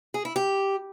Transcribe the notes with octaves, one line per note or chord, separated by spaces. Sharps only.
G#4
E4
G4